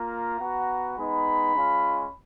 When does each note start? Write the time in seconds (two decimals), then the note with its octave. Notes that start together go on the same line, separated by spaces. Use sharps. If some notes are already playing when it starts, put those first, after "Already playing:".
Already playing: A#3 F4 A#5
0.39 B3 F#4
0.96 G#3 B3 D#4 B5
1.53 G#3 C#4 F4